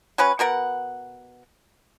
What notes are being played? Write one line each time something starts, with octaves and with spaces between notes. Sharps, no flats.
F#3 C#4 B4
B2 B3 A#4 F#5